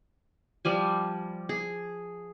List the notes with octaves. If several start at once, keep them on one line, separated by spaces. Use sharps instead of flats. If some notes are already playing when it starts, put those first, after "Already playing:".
F3 G3 G#5
G#4